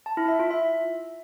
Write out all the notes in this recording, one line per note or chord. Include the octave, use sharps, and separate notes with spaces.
A5
E4
E5
F4
E5